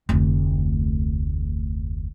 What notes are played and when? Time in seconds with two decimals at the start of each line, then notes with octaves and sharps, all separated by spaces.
0.09 F1 D2